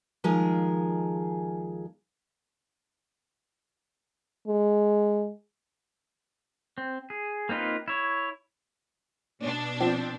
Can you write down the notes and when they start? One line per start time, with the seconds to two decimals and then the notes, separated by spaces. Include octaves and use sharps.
0.24 D#2 F3 G#3 G#4 A#4
4.48 G#3
6.78 C4
7.10 G#4
7.49 A#3 C4 D#4 F4 B4
7.88 E4 C#5
9.42 B2 D4
9.80 F3 C4